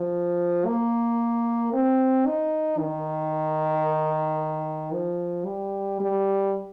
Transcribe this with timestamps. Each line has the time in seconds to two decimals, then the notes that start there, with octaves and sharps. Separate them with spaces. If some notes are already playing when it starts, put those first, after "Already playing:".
Already playing: F3
0.66 A#3
1.73 C4
2.26 D#4
2.79 D#3
4.93 F3
5.46 G3
6.00 G3